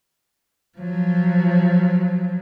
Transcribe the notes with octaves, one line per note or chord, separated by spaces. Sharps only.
F3 F#3